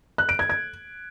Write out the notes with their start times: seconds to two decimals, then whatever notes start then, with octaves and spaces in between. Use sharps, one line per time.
0.18 F#6
0.29 D7
0.39 G#6
0.49 G#6